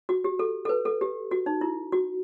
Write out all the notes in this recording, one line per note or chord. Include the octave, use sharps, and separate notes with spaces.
F#4
G4
A4
A4
B4
A4
G4
F#4
D#4
E4
F#4